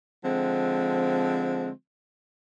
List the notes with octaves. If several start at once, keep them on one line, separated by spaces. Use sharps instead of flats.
D3 F3 G#3 C4